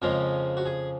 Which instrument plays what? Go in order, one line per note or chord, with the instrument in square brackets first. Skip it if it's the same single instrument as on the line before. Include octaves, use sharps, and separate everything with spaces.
[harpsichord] F2 C#3 F3 G#3 A#4
F#4
G#4